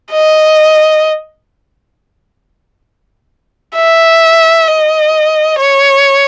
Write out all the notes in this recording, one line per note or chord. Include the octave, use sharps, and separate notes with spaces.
D#5
E5
D#5
C#5